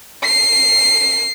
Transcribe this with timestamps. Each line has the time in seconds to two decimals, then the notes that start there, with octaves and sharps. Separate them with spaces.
0.25 C7